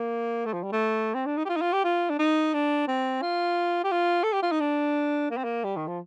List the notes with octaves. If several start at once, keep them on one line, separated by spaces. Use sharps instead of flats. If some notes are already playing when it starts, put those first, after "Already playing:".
Already playing: A#3
A3
F3
G3
A3
C4
D4
D#4
G4
F4
D#4
F4
G4
F4
D4
D#4
D4
C4
F4
G4
F4
A4
G4
F4
D#4
D4
A#3
C4
A#3
G3
D#3
F3